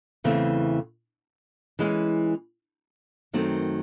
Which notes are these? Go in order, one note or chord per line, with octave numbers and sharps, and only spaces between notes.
E2 C#3 E3 A3 C4
E3 G#3 C#4
F#2 D#3 F#3 A3 C4